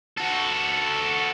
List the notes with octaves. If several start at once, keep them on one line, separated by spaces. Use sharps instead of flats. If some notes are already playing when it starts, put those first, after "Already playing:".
F#4 A4